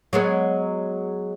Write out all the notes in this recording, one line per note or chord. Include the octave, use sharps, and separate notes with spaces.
F#3 G#3 B3